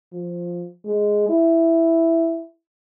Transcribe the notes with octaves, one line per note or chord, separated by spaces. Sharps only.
F3
G#3
E4